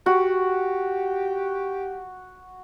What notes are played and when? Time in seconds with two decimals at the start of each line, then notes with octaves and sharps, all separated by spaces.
0.06 F#4 G4